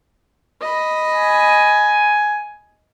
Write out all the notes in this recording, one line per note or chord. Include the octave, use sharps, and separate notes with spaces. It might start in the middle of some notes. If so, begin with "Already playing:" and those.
D#5 B5
G#5